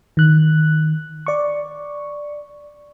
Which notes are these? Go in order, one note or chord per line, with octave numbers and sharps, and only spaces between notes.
D#3 F#6
D5 C#6